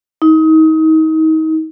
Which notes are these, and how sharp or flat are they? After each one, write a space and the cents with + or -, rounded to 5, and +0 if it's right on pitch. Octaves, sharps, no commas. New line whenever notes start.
D#4 +30